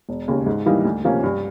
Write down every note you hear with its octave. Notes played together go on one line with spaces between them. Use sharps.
E1
D#2 C#3
G#2
E3 G3 A#3 D#4
D2
C3 F3 A#3 C#4
G2